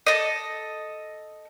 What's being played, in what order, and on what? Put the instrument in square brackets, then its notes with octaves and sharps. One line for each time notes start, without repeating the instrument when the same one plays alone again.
[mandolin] A4 D#5